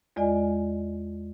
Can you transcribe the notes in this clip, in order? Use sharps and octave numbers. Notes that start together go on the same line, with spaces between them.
E2 G#3 F4 D5 D#5 G#5